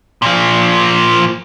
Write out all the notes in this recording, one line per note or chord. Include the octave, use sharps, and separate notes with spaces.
A#2 F3